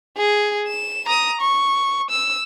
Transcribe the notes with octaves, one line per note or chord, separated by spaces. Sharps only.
G#4
E7
A#5 D#6
C#6
E6